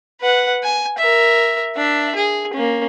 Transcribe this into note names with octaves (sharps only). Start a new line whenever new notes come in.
B4 F#5
G#5
A#4 E5
D4 E5
G#4
A#3 C#4